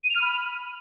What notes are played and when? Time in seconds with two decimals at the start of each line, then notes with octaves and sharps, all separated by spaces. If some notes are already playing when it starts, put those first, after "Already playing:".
0.03 D#7
0.09 F7
0.15 F6
0.21 B5